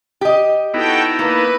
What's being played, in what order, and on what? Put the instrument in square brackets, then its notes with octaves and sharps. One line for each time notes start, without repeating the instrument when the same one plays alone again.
[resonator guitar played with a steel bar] G4 D#5
[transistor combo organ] B3 D#4 E4 [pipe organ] F#4 A4 G5
[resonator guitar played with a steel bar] A#3 [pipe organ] B4